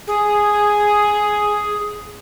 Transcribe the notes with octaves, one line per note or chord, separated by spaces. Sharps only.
G#4 G#5